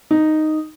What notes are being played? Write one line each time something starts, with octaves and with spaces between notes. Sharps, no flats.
D#4